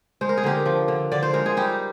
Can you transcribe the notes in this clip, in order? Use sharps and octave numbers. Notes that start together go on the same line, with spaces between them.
G#3 C5
A#4
G#4
D3 G4 A#4
F3
D3
D3 D5
C5
G#3 A#4
G#4
G3 D#4 G4